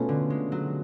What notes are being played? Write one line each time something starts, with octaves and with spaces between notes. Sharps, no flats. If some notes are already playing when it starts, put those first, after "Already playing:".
Already playing: B2 A3 C#4 F4 B4
D3
G#3
F#3